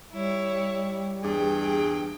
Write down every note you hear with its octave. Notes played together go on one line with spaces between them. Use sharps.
G3 E4 C#5
E2 G2 G#4 G5